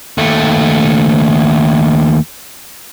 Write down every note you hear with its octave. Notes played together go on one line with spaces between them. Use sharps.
D#2 A3